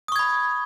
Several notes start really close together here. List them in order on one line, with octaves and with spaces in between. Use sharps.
D#6 C#6 G#6 B5